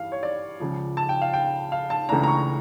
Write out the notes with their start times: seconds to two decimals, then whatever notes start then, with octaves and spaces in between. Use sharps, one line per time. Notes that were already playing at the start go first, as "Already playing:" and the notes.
Already playing: G2 E3 F5
0.12 C#5
0.23 D5
0.60 C#2 C#3 F3
0.97 A5
1.09 G5
1.22 F5
1.33 G5
1.72 F5
1.90 A5
2.09 C#2 C#3 E3 A3 D4 A#5
2.23 A#5
2.28 C#6